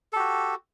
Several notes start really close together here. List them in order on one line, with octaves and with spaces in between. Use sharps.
A4 G4 F#4